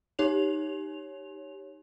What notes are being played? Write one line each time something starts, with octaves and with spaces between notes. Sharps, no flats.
D#4 G4 C#5 F7